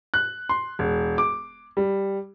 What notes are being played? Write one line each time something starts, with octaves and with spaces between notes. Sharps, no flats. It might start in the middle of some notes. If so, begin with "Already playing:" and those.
F#6
C6
E1
D6
G3